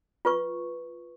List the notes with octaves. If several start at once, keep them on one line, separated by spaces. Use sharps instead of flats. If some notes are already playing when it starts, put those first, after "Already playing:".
F4 B4 C#6